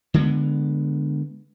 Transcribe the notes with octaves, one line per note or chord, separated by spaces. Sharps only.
D3 G#3 A#3 B3